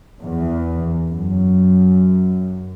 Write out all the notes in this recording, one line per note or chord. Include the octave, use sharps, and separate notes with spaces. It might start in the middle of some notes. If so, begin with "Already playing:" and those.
E2
F#2